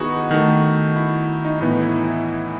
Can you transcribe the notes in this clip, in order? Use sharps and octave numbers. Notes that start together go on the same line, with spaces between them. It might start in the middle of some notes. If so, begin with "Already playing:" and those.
Already playing: D#3 B3 D#4 E4 F#4 G#4
D#3 A3
E4
D#4
A2 E3 B3 D#4
E4
E4